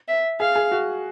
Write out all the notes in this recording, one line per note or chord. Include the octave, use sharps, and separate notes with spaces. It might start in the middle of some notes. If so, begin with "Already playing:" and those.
E5
G#4 F5
G#4
F#4